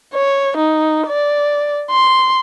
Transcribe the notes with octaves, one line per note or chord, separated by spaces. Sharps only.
C#5
D#4
D5
C6